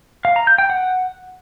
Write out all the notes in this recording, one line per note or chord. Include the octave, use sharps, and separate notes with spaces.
F5
A#5
G6
G5
F#5